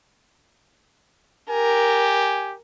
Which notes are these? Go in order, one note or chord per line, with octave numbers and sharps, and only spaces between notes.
G4 A#4 G#5